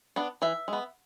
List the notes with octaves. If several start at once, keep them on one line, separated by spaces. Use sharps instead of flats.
B3 D4
E3 E5
G#3 B3